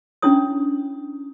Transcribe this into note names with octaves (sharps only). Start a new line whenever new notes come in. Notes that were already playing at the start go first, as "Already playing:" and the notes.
C#4 D4 E4 C#5 D#6